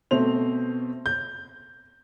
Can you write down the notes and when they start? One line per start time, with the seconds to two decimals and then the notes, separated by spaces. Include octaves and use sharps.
0.11 B2 A3 C4 C5 F7
1.06 G6